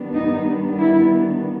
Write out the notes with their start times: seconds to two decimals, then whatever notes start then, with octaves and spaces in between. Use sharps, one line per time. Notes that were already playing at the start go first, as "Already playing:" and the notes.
Already playing: D#3 G3 B3 D4
0.14 D#4
0.78 E4